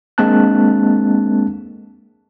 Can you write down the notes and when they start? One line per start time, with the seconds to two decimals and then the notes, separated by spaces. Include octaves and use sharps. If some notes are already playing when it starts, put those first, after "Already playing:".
0.18 G#3 A#3 C4 D4 A5 F#6